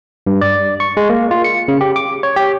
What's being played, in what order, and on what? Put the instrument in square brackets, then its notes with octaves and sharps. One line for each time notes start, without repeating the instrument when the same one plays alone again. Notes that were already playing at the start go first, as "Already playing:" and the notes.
[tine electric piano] G2
D5
C#6
G#3
A#3
F4
C#7
C#3
G4
D6
C#5
G4